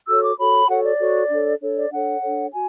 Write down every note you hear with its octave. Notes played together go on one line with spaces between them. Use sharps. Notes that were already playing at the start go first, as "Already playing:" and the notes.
F#4 A4 C#5 E6
D6
F#4 A4 C#5 B5
F#4 A4 C#5 F#5
D5
F#4 A4 C#5
D4 A4 C#5
D4 A4 C#5
D5
D4 A4 C#5 F#5
D4 A4 C#5
F#4 G#5